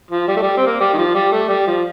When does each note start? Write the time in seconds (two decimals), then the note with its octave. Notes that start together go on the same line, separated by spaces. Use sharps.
0.11 F3
0.28 G3
0.37 A3
0.42 G3
0.57 C4
0.67 A#3
0.80 G3
0.93 D#3
0.98 F3
1.15 G3
1.32 A3
1.49 G3
1.67 F3